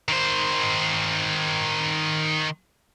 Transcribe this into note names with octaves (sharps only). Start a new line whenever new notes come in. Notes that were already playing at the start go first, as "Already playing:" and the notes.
D#3 C5